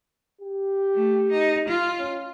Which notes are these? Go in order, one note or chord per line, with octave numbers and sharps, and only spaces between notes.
G4
A3
D#4
F4
C#4